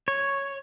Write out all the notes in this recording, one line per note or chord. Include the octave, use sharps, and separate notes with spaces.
C#5